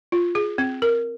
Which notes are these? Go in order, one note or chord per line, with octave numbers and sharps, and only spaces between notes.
F4
G#4
C4
A#4